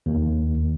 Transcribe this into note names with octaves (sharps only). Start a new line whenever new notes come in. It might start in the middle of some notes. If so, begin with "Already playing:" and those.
D#2